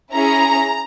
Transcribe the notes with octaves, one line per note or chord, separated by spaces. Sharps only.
C#4 E4 G#4 A#5